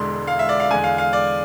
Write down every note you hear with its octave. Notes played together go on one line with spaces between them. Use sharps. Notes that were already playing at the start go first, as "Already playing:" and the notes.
Already playing: E1 E2 D3 G#3 C6
F5
E5
D5
F5
E2 D3 G#3 G#5
F5
F5
D5